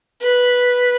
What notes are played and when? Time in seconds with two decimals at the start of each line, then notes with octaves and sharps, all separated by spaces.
0.22 B4